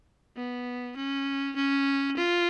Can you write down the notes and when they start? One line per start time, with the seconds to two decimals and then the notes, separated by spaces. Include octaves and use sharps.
0.37 B3
0.97 C#4
1.56 C#4
2.17 F4